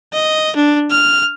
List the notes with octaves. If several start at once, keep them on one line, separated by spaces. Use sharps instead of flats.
D#5
D4
F6